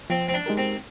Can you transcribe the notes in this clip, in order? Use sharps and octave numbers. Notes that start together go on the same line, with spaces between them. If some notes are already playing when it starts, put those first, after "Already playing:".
F3 C4
C4
D4
G#3 D#4 G4 A#4
C4